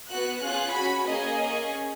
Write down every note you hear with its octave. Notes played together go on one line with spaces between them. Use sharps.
B3 F#4 F#6
C#4 F4 G#4 F#6
C#4 F#4 B5
A#3 C#4 G#4 D#5
C#4 G#4